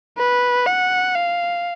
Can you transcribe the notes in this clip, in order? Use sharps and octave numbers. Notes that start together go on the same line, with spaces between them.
B4
F#5
F5